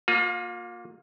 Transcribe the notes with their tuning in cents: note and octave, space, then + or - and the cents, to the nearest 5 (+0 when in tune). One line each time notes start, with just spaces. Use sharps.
A#3 +0 F4 +35